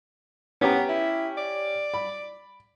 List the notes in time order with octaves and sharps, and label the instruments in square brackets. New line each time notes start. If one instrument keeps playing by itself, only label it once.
[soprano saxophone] B3 [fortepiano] C#4 G4 A#5
[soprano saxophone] E4
D5
[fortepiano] B5